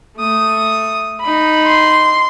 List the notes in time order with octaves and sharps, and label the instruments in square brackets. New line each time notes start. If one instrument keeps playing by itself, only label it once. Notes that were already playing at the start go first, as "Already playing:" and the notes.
[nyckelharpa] A3 D#6
D#4 B5
[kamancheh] C6